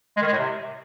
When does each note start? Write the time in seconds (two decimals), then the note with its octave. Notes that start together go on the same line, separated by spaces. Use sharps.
0.17 G#3
0.22 D#3
0.27 G#3
0.33 A2
0.38 C3